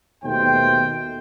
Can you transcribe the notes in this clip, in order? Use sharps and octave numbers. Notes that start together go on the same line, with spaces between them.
D#2 B2 A3 D#4 C5 G5